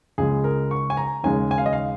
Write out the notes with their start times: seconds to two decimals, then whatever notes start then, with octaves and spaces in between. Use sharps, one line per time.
0.18 C#2 C#3 G#3 G#4
0.44 A#4
0.71 C#6
0.90 G#5
0.97 A#5
1.24 D#2 C#3 G#3 G#5
1.51 G#5
1.58 F5
1.66 D#5
1.73 F5